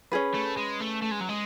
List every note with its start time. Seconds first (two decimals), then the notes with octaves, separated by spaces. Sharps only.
0.12 C#4 G#4 B4
0.34 A3
0.57 G#3
0.81 A3
1.02 A3
1.12 G#3
1.21 F#3
1.29 G#3